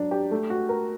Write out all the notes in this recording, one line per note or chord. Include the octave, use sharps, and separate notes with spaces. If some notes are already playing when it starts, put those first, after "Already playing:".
Already playing: F#3 D4
G4
A3
F#4
A#4